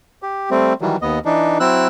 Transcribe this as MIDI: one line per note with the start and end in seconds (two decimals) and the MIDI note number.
0.23 0.50 67
0.51 0.73 55
0.51 0.73 57
0.51 0.73 60
0.81 0.97 51
0.81 0.97 52
0.81 0.97 54
0.81 0.97 55
1.02 1.19 39
1.02 1.19 59
1.02 1.19 75
1.25 1.58 52
1.25 1.58 62
1.25 1.58 63
1.60 1.88 54
1.60 1.88 60
1.60 1.88 64
1.60 1.88 88
1.60 1.88 90